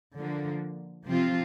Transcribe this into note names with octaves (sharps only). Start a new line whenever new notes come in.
D3 F3 A#3
C3 F3 C4 F4